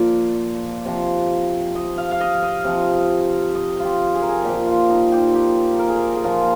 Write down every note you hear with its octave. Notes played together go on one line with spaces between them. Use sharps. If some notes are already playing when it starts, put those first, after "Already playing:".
Already playing: A#2 F3 D5
C3 F3
D#5
F5
F5
D#5
D#5
C3 F3
D#5
F4
G4
G#4
A#4
G#4
A#2 F3 G4
F4
D#4
G4
G4
A#4
G#4
A#4
G#4
A#2 F3 A#4